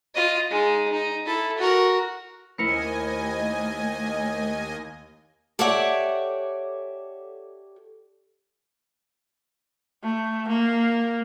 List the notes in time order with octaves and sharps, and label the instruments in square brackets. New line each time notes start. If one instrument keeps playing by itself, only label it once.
[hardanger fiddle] F4 D#5
G#3 D#4
D#4
E4 A4
F#4 A#4
[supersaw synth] D#2 D#5 G#5 [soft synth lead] A3 [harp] E4 A#4 C#7 [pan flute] C5
[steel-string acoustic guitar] G4 A4 C#5 D5 E5 F#5
[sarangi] A3
A#3